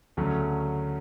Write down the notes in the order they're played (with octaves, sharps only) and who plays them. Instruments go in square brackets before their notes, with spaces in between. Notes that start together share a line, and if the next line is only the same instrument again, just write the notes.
[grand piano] D2 C#3 F#3 A3 C#4